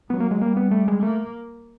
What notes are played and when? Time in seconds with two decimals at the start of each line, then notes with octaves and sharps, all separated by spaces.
0.10 F#3 B3
0.20 A#3
0.31 G#3
0.41 G3 A#3
0.57 B3
0.71 A3
0.88 G#3
1.02 A3 A#3